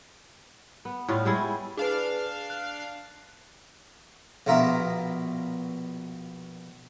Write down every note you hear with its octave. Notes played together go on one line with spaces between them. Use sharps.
B3
A2 G3 F4
G3 G#3 E4
D4 G#4 B4 F5
F#6
A#1 B2 F4 A#4 E5